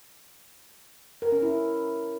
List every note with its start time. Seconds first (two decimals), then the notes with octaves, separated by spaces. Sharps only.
1.22 A#4
1.32 C#4
1.42 E4